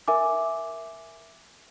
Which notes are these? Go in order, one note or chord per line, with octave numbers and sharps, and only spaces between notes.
A#4 E5 G#5 D6